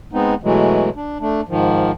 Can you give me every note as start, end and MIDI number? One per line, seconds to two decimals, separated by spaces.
0.13 0.34 56
0.13 0.34 59
0.13 0.34 60
0.13 0.34 63
0.43 0.90 47
0.43 0.90 52
0.43 0.90 54
0.43 0.90 56
0.43 0.90 57
0.96 1.18 62
1.20 1.41 57
1.20 1.41 62
1.49 1.92 44
1.49 1.92 51
1.49 1.92 53